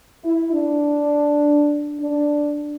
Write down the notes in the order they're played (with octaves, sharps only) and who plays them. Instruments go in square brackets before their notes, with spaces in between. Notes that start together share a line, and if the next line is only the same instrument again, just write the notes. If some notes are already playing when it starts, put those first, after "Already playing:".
[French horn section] E4
D4
D4